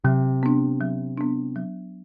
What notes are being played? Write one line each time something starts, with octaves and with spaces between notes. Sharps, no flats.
C3 F#3
B3 D4
F#3
B3 D4
F#3